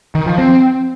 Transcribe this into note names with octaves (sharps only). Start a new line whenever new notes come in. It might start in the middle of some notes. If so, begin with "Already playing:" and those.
D#3
F3
C4